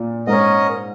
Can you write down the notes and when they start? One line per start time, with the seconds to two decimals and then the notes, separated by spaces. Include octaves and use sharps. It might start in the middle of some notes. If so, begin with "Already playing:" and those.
Already playing: A#2
0.27 G#2 C#4 A#4 D#5